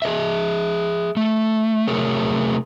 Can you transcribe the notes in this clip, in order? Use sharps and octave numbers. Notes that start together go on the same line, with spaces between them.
G#4 A#4 D#5 E5
A3
C3 F#3 A3 G#4 A#4 C#5